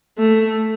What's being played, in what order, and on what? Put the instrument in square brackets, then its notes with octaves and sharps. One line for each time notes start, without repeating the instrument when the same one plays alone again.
[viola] A3